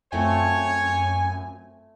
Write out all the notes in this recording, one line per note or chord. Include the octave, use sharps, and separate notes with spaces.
F#2 A3 C4 F4 C#5 G#5